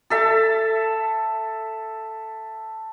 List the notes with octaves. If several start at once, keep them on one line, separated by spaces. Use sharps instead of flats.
A4 E5 A5